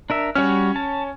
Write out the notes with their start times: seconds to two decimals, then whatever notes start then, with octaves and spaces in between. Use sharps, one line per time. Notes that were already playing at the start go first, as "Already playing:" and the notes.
0.10 D4 A#4 E5
0.35 G3 C#4 F#4 C#5 F6
0.76 A5